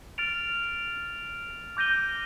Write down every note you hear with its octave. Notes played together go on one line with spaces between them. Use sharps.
F6 A6 D7 F7
D6 G6 A#6 D#7 G7